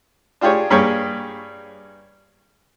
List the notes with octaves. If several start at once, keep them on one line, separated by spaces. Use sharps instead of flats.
D4 F4 G4 G#4 C#5
G2 A#3 G4 G#4 C#5